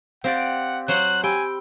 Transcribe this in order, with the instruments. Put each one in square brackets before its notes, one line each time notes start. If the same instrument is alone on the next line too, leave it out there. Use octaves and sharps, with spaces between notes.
[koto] C4 G4 D5 [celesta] F5 [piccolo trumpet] F#5
[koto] F#3 C5 F#5 [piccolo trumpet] F#6
[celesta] G4 B5 E6 [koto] G5 [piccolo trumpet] G#5